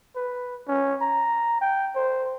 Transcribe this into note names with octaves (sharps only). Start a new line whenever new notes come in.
B4
C#4
A#5
G5
C5